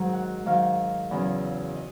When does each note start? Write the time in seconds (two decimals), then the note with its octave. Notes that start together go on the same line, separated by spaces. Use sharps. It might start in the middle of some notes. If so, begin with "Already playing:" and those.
Already playing: G#2 D#3 F#3
0.13 F#5
0.46 G#2 D#3 F#3 F5
1.11 E2 C#3 F#3
1.76 D#5